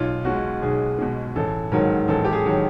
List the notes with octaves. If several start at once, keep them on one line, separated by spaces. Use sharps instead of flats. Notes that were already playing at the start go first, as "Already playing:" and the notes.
Already playing: B1 F4
B2 G#3 F#4
B1 G#4
B2 G#3
A1 A4
G#2 D#3 F#3 A#4
A1 A4
G4
G#4
D#3 F#3